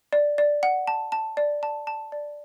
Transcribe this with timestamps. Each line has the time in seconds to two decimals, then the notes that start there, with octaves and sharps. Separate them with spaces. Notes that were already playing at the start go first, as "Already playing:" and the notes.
0.13 D5
0.38 D5
0.63 F#5
0.87 A5
1.12 A5
1.37 D5
1.63 A5
1.87 A5
2.12 D5